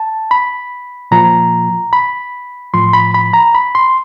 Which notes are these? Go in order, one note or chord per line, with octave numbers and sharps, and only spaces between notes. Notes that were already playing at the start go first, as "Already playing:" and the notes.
Already playing: A5
B5
A#2 F3 A#5
B5
A2 F3 C6
B5
B5
A#5
B5
C6